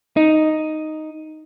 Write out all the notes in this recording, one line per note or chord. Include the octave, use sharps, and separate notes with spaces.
D#4